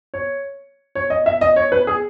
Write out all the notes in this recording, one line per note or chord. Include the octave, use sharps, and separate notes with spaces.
C#5
C#5
D#5
E5
D#5
C#5
B4
G#4